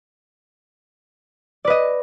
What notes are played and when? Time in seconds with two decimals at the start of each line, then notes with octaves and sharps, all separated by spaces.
1.65 D5
1.67 B4
1.70 D#5